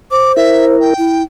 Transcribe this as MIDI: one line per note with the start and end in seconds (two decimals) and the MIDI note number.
0.11 0.76 72
0.11 0.32 86
0.36 0.94 64
0.36 0.94 70
0.36 0.65 76
0.81 1.23 79
0.98 1.22 64